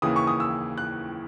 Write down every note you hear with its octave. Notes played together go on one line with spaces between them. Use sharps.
D#2 C#3 E3 D#6
C#6
D#6
E6
F#6